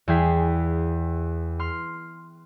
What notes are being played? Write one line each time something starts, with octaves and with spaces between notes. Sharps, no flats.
E2 G#4 G5 B6
C6 F6